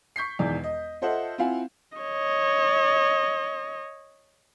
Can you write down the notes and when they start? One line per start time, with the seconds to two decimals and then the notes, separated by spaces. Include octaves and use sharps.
0.16 C#6 G6 B6 C7
0.39 E1 E2 D#3 D5
0.64 D#5
1.02 F4 A4 C5 D#5 E5 F#5
1.38 C4 E4 F4 F5 F#5 G#5
1.98 C#5 D#5